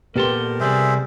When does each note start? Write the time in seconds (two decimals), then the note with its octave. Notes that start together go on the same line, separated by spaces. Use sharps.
0.16 A#2 B3 G4 A4 A#4 C6
0.60 C2 G3 G#4 C5 E5